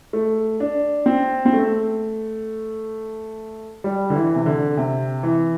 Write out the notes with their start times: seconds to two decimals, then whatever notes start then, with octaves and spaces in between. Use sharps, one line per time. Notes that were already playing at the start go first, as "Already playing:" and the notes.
0.13 A3
0.60 D4
1.06 C4
1.46 C4
1.53 A3
3.84 G3
4.10 D3
4.15 E3
4.35 C3
4.46 D3
4.77 C3
5.23 E3